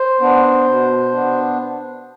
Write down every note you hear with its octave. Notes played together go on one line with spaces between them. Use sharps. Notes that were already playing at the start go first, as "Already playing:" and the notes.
Already playing: C5
B3 D4
B2
B3 D4